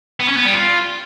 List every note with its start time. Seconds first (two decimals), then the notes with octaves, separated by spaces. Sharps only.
0.20 B3
0.28 C#4
0.37 B3
0.45 G3
0.54 F4